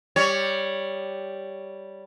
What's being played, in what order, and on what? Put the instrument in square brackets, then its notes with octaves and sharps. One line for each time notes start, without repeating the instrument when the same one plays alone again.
[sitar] G3 C#5